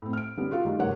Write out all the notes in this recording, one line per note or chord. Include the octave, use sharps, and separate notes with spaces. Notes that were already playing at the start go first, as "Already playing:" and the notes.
A2 C4
F6 D7
D3 G3 B3 C#4
F4 F#4 A4 F5
D#3 G3 G#3
F1 G2 A#4 C#5 F#5